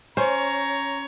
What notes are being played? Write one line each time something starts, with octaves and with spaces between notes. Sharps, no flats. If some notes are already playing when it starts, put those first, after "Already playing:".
C#4 C5 C#5 A#5